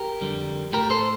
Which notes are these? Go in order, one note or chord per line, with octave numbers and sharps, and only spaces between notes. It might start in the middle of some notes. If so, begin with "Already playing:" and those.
Already playing: G4 A#4
F2 D3 G3
A2 A3 G4 A#4
A4 C5